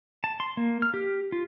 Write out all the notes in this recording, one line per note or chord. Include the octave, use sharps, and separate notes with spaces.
A5
C6
A#3
F6
G4
F4